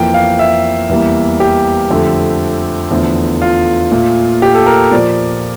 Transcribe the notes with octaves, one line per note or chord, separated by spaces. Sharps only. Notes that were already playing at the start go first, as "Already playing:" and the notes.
Already playing: F2 E3 A#3 G5
F5
E5
E2 E3 G3 A#3
G4
F2 D3 A3
E2 D3 F3 A3
F4
A#2 A3
G4
A4
A#4
A#2 F3 A#3 D5